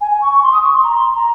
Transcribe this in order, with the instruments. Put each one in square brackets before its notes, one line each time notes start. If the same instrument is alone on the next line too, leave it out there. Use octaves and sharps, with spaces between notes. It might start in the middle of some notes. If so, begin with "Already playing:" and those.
[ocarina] G#5
G#5
C#6
C#6
C6
D#6
C#6
C6
A#5
C6
A#5